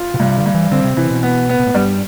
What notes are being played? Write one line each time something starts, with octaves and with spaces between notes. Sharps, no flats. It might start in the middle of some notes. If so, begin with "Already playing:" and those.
Already playing: F4
B2
G2 C3
D3
G2
E3
D3 C4
C3
C3 E3
B2
B3
B3
B2
A2
G2 G3